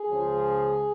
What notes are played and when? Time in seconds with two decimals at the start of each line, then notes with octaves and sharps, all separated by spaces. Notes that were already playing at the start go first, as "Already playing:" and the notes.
Already playing: G#4
0.09 C#2 C#3 F3